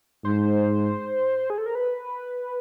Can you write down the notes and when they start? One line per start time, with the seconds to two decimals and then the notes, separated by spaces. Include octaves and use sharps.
0.25 G#2 C5
1.50 G#4
1.58 A4
1.66 A#4
1.75 B4